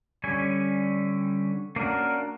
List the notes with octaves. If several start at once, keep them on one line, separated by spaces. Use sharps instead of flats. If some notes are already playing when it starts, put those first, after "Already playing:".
D3 G3 C#4 G#5
A#3 C#4 D4 F#4 A#4